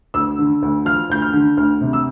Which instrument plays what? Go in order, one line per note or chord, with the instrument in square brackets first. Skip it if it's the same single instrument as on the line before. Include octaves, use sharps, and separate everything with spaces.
[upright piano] D2 E6
D3
D2
F3 F6
D2 G6
F6
D3
D2 F6
C3
E6